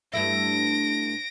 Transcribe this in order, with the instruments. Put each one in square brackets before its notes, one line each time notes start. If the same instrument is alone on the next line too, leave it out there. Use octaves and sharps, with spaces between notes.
[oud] G2 A3 E4 [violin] A#6 D7